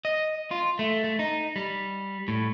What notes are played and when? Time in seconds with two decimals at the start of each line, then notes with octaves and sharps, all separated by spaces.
0.05 D#5
0.51 F4
0.79 A3
1.04 A3
1.19 D#4
1.56 G3
2.28 A2